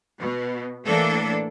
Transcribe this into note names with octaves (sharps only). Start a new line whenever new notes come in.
B2
A2 E3 A#3 D4 A4